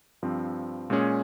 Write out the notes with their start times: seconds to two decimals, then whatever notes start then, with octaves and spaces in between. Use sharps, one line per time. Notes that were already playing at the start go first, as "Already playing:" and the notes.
0.23 G2 F3 C4
0.90 A#2 G#3 C#4 G#4